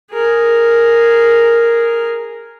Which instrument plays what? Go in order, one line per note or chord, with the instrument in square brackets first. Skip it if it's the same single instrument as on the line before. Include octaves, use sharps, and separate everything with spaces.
[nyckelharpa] G#4 A#4